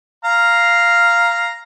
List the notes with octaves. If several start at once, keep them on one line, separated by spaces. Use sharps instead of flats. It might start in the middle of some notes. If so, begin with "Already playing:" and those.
F5 A#5